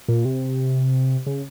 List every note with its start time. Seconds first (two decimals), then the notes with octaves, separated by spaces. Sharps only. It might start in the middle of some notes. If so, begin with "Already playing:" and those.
0.08 A#2
0.25 C3
1.26 C#3